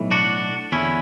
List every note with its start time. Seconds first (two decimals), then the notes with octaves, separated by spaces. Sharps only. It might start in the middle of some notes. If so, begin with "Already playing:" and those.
Already playing: B1 A2 E3
0.11 D4 F#4
0.72 E2 D3 C#4 E4